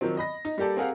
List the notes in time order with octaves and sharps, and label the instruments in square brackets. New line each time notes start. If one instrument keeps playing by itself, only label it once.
[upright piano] D#3 F3 F#3 C4
D#5 B5 A#6
D#4
G3 A#3 G4 A4 D5
C4 G4 G#4 A#4 F5 F#5